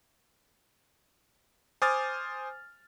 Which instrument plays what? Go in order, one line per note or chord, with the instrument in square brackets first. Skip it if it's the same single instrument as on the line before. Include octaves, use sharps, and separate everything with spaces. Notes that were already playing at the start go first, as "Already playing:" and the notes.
[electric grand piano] C5 G#5 D6 D#6 F6 A6